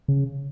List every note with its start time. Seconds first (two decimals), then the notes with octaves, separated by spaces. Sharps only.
0.08 C#3